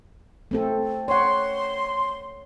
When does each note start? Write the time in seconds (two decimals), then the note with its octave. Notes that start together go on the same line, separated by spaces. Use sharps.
0.51 A3 C4 A4
1.08 C#5 F#5 C6